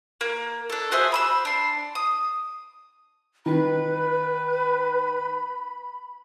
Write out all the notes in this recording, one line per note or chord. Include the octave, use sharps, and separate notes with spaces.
A#3
D4 A4
F#4 G#4 C5 E5
B5 D#6 E6
D4 C6
D#6
D#3 B4 B5